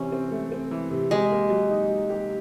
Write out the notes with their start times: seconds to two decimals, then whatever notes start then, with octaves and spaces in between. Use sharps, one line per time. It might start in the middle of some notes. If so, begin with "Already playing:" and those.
Already playing: C3 E3 C4 C#4
0.12 C4
0.32 A3
0.52 C4
0.71 E3
0.91 C3
1.11 G#3 G4
1.31 A#3
1.50 F#3
1.70 D#4
1.90 F#3
2.10 G4